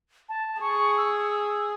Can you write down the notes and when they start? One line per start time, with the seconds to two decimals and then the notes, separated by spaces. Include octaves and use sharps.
0.29 A5
0.61 G#4 C#6
0.97 E6